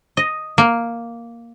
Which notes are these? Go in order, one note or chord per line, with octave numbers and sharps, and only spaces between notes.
D#5
A#3